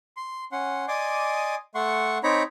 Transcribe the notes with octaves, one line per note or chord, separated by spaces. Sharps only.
C6
C#4 F#5 C6
D5 D#5 G#5 C6 D6 D#6
A3 F#5 C6 C#6
C4 D#4 C#5 A#5 B5